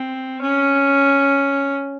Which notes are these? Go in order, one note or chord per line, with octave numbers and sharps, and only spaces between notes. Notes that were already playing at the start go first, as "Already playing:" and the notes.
Already playing: C4
C#4